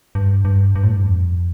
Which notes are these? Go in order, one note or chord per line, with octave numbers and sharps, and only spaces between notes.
G2
G2
G2
A2
G2
F2